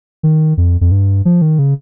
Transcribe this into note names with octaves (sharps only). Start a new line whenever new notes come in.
D#3
F2
F2
G2
F3
D#3
C#3